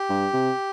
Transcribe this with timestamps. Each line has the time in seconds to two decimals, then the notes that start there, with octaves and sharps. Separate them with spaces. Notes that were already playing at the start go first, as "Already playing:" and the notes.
Already playing: G4
0.09 G2
0.33 C3